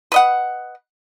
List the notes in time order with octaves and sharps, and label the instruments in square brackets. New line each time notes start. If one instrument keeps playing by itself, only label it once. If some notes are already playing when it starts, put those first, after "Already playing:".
[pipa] B4 D#5 F#5